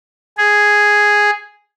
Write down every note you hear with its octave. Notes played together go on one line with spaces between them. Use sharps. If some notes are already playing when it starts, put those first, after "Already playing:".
G#4